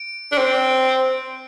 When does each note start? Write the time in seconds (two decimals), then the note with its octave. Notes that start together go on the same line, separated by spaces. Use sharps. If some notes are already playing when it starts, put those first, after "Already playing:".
Already playing: D7
0.32 D4
0.37 C4